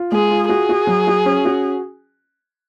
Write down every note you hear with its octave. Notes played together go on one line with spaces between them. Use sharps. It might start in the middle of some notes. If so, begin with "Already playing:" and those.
Already playing: F4
G#3 G#4
F4
F#4 G#4
F#4
F#3
F#4
C#4
F#4